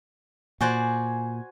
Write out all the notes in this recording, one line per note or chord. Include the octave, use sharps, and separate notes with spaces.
A#2 F#4 C5 D5 G#5